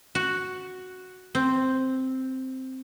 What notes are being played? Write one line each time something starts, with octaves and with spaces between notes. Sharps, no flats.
F#4
C4